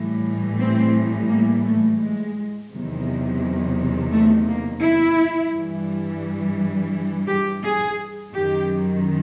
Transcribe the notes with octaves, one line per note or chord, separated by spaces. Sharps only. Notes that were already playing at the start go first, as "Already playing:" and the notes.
Already playing: A2 E3 G3
C4
A#3
A3
G#3
E2 C3 D#3 F#3
A3
A#3
E4
G2 E3 G3
G4
G#4
F#2 D#3 F#3 G4